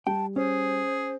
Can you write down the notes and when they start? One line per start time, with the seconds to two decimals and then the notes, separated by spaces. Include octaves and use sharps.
0.07 G3 G5 A5
0.36 C#4 G#4 C5